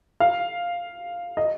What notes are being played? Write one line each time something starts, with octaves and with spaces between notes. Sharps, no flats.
F5
D#5